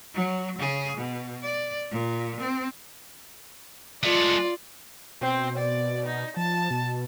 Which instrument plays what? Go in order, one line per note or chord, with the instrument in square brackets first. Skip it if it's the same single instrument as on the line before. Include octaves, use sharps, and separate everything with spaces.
[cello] F#3
C#3 G#4
B2
D5
A#2
C4
[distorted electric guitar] G#3 A3 [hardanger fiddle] F4 D5
[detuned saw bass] B2 [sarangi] C4
[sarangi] D5
D#4
[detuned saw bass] F3 [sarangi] A5
[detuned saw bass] B2